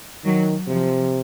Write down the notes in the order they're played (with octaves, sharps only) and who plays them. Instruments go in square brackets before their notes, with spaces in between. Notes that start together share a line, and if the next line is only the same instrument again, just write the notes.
[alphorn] D#3 [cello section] F#3
[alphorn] C3 [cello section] F3